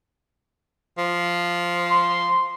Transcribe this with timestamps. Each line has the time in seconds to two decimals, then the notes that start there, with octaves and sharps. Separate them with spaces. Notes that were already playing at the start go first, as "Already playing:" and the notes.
0.98 F3
1.91 C6